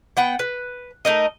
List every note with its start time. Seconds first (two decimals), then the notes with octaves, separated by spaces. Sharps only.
0.17 B3 F#5 G5
0.39 B4
1.05 A3 D#4 A#4 D#5